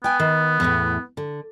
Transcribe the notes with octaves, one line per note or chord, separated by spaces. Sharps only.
B3 G5 G#5
D#3
E2 A2
D3